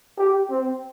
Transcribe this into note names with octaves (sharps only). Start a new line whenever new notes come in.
G4
C4